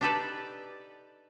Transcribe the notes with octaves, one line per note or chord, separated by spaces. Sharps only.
D4 D#4 G4 A4 B4 D5